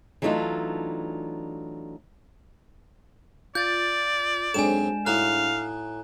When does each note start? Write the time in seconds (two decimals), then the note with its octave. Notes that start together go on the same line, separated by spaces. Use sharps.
0.22 E3 F#3 A3 D4 D#4 F4
3.55 F4 D5 G6 A6
4.54 G#2 F#3 G#3 C4 D4 A4 G#5 E7
5.06 A2 D#4 F#4 F5 A#5 F#6